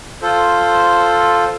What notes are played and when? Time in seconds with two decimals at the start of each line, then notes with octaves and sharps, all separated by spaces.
0.22 F4 A4 C5